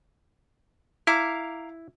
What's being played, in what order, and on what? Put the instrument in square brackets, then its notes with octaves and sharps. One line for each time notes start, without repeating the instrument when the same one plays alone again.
[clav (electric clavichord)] E4 [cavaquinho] F5 A#5 D6